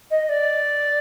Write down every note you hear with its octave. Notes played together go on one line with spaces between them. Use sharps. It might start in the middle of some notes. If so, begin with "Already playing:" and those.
D#5
D5